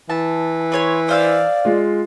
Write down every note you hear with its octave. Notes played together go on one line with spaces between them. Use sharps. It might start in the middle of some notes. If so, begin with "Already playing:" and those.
E3 A5
B4 C#5 C6
C5 D5 F5 E6
G#3 F4